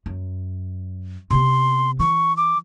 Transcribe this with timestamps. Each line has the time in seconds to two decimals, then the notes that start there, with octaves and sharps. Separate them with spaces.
0.06 F#2
1.31 C3 B3 C6
2.00 E3 C#6
2.37 D6